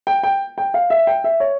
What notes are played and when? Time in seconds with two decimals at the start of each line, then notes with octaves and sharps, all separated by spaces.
0.07 G5
0.23 G5
0.58 G5
0.74 F5
0.90 E5
1.07 G5
1.24 E5
1.40 C#5